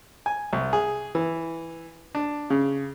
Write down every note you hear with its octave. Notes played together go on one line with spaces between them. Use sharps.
G#5
C2
G#4
E3
D4
C#3